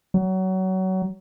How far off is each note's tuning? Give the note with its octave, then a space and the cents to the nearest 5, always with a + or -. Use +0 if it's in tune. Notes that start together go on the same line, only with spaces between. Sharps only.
F#3 +25